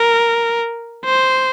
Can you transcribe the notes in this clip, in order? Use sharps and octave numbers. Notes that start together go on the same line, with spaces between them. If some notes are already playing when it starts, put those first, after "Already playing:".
Already playing: A#4
C5